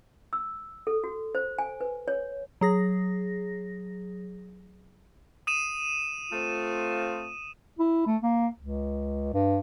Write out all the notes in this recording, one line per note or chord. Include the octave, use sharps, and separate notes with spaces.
E6
A4
F#4
C5
G#5
B4
C#5
F#3 G#4 A#6
D#6 D#7 E7
A3 C4 F4
E4
A3
A#3
C#2
G2